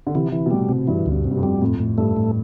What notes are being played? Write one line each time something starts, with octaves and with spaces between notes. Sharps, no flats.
D3
C3 E3
E3
B2
A2 G3
C3
G2 E3
D2
G2
C3
G2
F2
G3
F2 A2
A2
G2 A3
A2